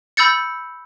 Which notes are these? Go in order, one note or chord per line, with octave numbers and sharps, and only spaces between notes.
B5 E6 G6 A6 C#7